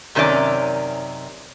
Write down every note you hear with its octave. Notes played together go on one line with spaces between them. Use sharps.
F#2 C3 D#3 C#4 D5